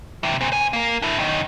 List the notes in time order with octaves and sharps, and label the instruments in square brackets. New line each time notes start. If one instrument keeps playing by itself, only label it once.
[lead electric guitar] C3 E3
A#2 C4
C5 G#5
A#3 A#4
D4 E4
F#2 D#3